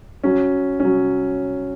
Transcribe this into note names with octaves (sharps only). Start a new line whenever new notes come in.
F#3 C#4
F#3 C#4